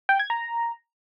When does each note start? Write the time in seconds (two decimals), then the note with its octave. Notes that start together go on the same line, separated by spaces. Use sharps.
0.09 G5
0.19 G#6
0.30 A#5